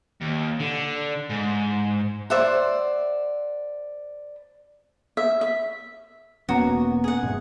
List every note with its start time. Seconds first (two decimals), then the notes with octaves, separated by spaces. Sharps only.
0.21 D#2
0.60 D3
1.29 G#2
2.30 C5 D5 E5 F#5
5.17 E5
5.41 E5
6.49 E1 A#3 B3 C#4 F#4 A#5
7.04 G#4 F#5
7.23 D2 G2 C3